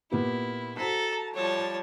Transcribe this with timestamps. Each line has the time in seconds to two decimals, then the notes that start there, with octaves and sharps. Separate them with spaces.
0.12 A#2 B3 E4 G4
0.77 F#4 A4 C5 A5 A#5 B6
1.35 F3 G3 C#5 A5